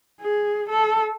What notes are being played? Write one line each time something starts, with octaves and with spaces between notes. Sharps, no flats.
G#4
A4